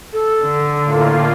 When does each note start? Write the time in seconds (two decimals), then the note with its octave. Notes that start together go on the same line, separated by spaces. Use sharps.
0.13 A4
0.43 D3
0.85 A2 A#3 F4